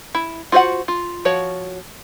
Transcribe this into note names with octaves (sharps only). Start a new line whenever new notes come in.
E4
F4 F#4 C5 C#5 F#5
F4
F3 F#4 C#5